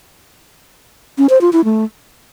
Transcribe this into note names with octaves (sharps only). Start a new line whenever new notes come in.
C#4
C5
F4
E4
A3